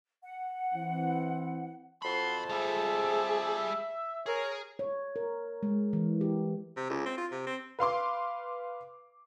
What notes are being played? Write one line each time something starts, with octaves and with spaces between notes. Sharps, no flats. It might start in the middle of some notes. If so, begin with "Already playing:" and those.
F#5
E3 C4
B1 F2 F#4 A5 B5 C6
G3 G#3 G#4 E5
G#4 A#4 C#5
C#5
A#4
G#3
E3
G4
C3
C#2
C4
F4
C3
C4
B4 F5 C6 D6